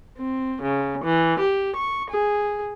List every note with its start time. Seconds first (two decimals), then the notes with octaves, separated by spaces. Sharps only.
0.19 C4
0.64 C#3
1.04 E3
1.40 G4
1.77 C#6
2.10 G#4